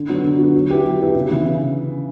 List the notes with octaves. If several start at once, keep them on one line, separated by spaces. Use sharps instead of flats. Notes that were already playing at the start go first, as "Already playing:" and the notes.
Already playing: D3
F#3 B3 F#4
D3
F#3 B3 F#4
F#3
B3 E4 G4 B4
F#3
B3 E4 G4 B4
C#3
E3 B3 E4
C#3